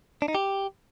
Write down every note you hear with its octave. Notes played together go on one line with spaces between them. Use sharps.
D4
D#4
G4